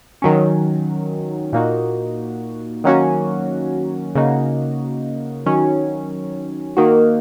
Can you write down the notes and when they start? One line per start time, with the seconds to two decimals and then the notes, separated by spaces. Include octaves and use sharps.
0.22 D#3 F#3 C#4
1.53 A#2 A#3 D#4 F#4
2.84 D#3 F#3 A#3 C#4 F#4
4.15 C#3 A#3 D#4 F#4
5.46 D#3 F#3 C#4
6.77 D#3 A#3 F#4